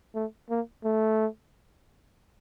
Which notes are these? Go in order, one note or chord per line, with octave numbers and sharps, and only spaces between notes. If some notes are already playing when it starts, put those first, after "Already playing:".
A3
A#3
A3